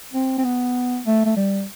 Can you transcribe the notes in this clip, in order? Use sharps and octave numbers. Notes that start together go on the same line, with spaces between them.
C4
C4
B3
A3
A3
G3